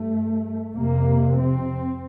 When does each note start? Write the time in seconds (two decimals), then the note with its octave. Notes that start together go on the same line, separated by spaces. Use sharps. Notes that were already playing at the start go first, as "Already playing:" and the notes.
Already playing: G2 A3
0.75 F2 C3 A#3
1.36 C4